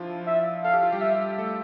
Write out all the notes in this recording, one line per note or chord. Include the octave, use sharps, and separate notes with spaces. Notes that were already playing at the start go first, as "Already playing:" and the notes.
Already playing: F3 D4 E4 F4
E5
A4 F5
G4
F4
G3 G4
E5
A3 A4